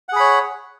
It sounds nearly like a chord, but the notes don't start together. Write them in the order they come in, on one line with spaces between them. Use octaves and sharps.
F#5 G#4 B5 C#5